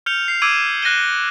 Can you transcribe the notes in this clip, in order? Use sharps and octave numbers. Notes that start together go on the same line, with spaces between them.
F6 G6 C#7 F7
C7
D6 E6 G#6 D7 D#7
F#6 A#6 C7 D#7 G7